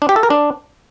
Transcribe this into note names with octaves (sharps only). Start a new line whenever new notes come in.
D4
G4
A4
A#4
D4